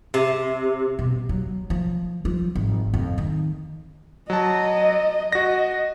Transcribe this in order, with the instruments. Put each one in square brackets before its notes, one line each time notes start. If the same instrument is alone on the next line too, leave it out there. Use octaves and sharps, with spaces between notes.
[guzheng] C3
[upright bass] B2
F#3
F3
F3
G#1
F2
D#3
[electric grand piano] F#3 A5 [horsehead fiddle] D#5
[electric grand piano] F#4 A#6 [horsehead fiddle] D#5